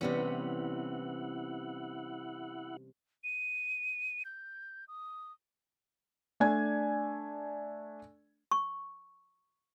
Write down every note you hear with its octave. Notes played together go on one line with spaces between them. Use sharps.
C3 E3 G3 B3 C#4 E4 F#5
D#7
G6
D#6
A3 D4 D5 G#5 G#6
C#6